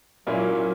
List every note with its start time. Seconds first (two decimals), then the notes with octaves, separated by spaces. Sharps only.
0.27 A#2 F#3 A#3 C#4 E4